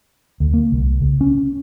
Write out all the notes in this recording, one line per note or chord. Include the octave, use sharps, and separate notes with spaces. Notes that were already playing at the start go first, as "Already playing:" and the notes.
D2
A#3
C2
C#2
C#4